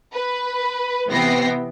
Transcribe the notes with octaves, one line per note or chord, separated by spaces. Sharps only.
B4
C3 E3 B3 G5 A#6 C7